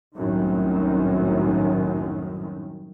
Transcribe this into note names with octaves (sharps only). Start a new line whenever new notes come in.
C2 F#2 A2 D#3